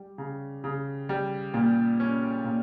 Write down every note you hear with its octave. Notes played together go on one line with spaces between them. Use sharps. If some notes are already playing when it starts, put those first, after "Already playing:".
Already playing: G3
C#3
C#3
G3
A#2
C#4
A#2